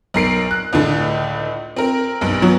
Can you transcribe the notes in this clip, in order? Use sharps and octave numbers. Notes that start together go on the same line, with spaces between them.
B1 A#4 C7 D7
F#6
C#2 A2 D3
C4 A#4
B1 G2
F#3 B3